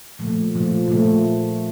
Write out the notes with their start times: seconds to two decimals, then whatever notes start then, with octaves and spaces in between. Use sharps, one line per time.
0.19 A#2 F3 A3
0.53 A#2 F3 A3
0.88 A#2 F3 A3